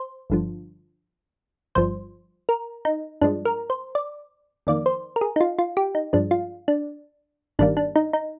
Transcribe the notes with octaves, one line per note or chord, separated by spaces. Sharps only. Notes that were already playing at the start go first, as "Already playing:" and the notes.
Already playing: C5
G1 G2 D3 F3
G1 G2 F3 C5
A#4
D#4
G2 F3 G#3 D4
A#4
C5
D5
F2 D#3 A#3 D5
C5
A#4
G#4
D#4
F4
F4
G4
D#4
G2 F3 G#3 D4
F4
D4
G1 G2 D#3 G3 A#3 D4
D4
D#4
D#4